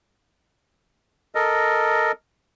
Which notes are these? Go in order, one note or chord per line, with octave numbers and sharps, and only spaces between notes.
A4 A#4 D#5